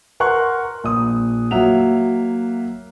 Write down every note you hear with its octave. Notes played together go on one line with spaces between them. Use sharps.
A#4 F#5 A#5 C6 C#6 F#6
A#1 D#6
F#3 A#3 E5 F#5 F7